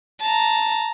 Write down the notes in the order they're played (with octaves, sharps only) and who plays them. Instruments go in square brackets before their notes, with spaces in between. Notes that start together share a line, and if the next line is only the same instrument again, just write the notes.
[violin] A5 A#5